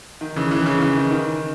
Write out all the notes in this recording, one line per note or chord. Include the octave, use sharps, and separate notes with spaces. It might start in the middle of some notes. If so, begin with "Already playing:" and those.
D#3
C#3 E3
C#3 E3
C#3 E3
C#3
D#3
D#3